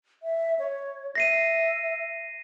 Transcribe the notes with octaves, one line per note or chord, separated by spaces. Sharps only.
E5
C#5
E5 A#6 C7 D#7